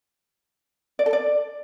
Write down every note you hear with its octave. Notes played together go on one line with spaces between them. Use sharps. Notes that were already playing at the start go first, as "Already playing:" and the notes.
D5
A4
D5